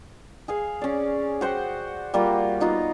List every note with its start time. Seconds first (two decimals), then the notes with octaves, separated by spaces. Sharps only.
0.48 G#4 F5 G#5
0.81 C#4 D5
1.41 F#4 C5 F#5 G5
2.14 G3 A#3 F4 F#4
2.60 B3 D#4 F4 F#4